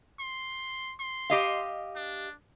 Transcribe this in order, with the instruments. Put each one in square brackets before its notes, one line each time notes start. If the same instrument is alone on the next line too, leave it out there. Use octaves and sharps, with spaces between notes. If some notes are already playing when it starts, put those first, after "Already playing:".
[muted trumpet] C6
C6
[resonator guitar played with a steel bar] G4 D#5 F5
[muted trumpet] D4